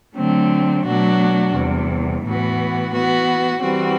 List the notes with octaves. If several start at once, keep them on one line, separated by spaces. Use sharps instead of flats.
D3 F#3 A3 C4
B2 F#3 A3 D4 F#4
E2 C3 G3
A2 E3 B3 F#4
E3 B3 F#4
E3 G3 C4 F#4